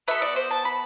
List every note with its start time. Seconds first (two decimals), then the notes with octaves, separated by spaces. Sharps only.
0.08 B3 F#4 A4 E5
0.22 D5
0.36 C5
0.51 A5
0.65 B5